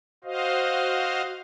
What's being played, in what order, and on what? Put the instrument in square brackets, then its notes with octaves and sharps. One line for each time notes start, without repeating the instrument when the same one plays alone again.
[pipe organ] F#4 C5 D#5 F5